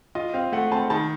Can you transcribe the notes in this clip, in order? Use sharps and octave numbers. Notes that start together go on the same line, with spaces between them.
F4 D#5
C4 F5
A3 F#5
C4 A5
D#3 A5